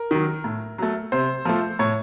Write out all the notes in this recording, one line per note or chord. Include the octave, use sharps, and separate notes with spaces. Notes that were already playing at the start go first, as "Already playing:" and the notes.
Already playing: A#4
D#3 F#3
A2
F#3 A3
C3 C5
F3 A3
A2 C#5